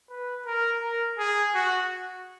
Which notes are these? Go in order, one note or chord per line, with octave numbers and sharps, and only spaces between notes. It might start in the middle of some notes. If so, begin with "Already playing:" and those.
B4
A#4
A#4
G#4
F#4